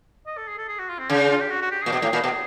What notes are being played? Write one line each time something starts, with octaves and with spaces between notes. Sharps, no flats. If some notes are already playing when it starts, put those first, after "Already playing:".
D#5
A4
G#4
A4
G#4
F#4
F4
C4
C#3 C#4
F4
G4
F#4
F#4
G4
A#2 G#4
B2
A2
A#2
B2